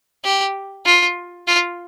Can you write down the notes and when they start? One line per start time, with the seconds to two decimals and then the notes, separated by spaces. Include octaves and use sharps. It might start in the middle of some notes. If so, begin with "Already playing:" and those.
0.24 G4
0.85 F4
1.47 F4